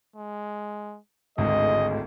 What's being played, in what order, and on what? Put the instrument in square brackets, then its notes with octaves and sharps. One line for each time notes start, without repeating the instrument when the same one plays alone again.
[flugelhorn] G#3
[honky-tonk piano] G#1 D2 A2 [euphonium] G#3 [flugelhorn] D#5